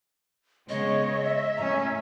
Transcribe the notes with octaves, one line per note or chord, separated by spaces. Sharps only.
C#3 G#3 B3 C#5 D#5
E5
A2 C#4 A#5